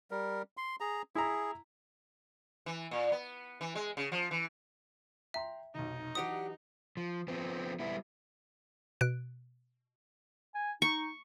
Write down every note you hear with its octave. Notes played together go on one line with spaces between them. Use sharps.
G3 A#4
C6
G#4 A#5
E4 G#4 A#5
E3
A#2
B3
E3
G#3
C#3
F3
E3
E5 G5 A#5 C6
F1 B1 D#4
E3 F#3 D4 G4 F#5 D#6
F3
F3 B3 C4
G3 B3 E4
B2 F#6 D7
G#5
D#4 C#6